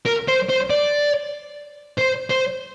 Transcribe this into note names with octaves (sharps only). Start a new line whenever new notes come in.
A#4
C5
C5
D5
C5
C5